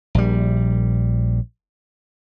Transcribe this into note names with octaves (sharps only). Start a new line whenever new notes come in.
A#1 G3